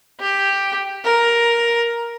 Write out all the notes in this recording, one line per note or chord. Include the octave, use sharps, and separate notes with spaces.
G4
A#4